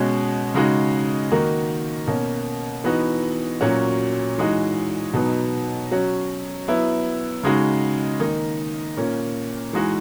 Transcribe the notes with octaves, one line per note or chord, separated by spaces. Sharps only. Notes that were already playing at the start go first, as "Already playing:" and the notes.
Already playing: B2 G#3 C#4 F#4
C#3 G#3 D#4 F#4
D#3 A#3 D#4 F#4
B2 A#3 C#4
E3 B3 D#4 F#4
A#2 F#3 C#4 F#4
E3 G#3 D#4 F#4
B2 F#3 B3 D#4
F#3 C#4 F#4
F#3 B3 E4
C#3 G#3 D#4 F#4
D#3 A#3 D#4
A#2 A#3 C#4
E3 G#3 D#4 F#4